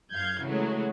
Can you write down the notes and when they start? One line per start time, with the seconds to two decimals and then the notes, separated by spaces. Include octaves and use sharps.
0.12 F#2 F5 G6 G#6
0.43 C#3 E3 F#3 G#3 A3